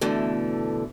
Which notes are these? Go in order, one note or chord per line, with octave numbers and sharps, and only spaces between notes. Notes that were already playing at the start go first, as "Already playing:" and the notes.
B2 D3 E3 A3